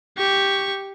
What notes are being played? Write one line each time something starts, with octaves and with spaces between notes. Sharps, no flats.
G4 C#6